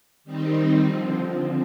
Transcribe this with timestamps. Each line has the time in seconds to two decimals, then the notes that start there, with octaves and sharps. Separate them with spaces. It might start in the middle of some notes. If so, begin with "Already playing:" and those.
0.24 D#3 G3 C4 D#4
0.83 D3 F3 C4